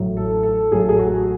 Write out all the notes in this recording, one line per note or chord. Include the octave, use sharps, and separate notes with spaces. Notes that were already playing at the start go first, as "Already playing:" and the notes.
Already playing: A1 A2 F#3
A4
A4
A1 A2 F#3 G#4
A4
G#4
F#4